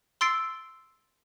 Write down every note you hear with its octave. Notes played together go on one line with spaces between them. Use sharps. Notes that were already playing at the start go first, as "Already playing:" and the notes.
C6 E6 A6 C7 D7